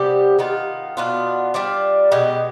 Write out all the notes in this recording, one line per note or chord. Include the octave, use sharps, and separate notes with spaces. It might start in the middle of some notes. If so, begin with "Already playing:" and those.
Already playing: C3 G3 B3 G4
D#3 B3 F4
B2 B3 D4 F4
G3 D4 F4
B2 G#3 B3 G4